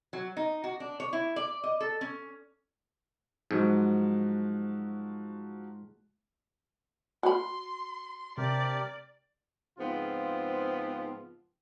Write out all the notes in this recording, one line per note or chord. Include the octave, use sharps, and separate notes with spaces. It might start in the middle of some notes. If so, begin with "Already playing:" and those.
F#3
D#4
F#4
D4
C#5
E4
D5
D#5
A4
C#4
G#2 F3 F#3 F#4
F#4 B5 C6
C3 D4 G4 A#4 D5
G#2 C#3 F3 B3 C4 F4